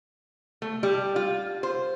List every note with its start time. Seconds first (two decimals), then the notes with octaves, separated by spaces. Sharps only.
0.62 A3
0.83 G3
1.16 F4
1.63 C5